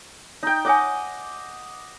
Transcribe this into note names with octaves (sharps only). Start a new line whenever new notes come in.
D#4 G5
C#5 D#5 F#5 G#5 D6